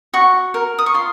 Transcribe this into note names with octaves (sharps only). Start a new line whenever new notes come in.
F#4 C#6
A#4
D#6
C#6
F4 C6